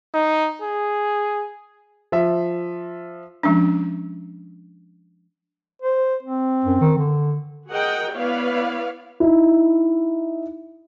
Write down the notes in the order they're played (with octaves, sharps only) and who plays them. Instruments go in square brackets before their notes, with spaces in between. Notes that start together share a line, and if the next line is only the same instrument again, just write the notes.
[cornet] D#4
G#4
[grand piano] F3 E5
[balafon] F3 G#3 C#4 D4
[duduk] C5
C4
[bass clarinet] F#2
D#3
D3
[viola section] F#4 G#4 A#4 D#5 F#5 G5
B3 E4 B4 C#5 D5 F5
[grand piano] D#4 E4